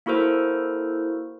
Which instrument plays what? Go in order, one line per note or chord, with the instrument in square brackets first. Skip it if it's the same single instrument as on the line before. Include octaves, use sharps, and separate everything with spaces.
[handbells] A#3 E4 F#4 A4 A#4 C5